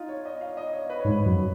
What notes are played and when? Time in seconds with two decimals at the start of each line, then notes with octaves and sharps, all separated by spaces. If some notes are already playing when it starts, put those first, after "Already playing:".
Already playing: D#4 F4
0.09 C#5
0.25 D#5
0.41 F5
0.57 D#5
0.73 C#5
0.90 B4
1.00 G#2 C#5
1.11 B4
1.26 F#2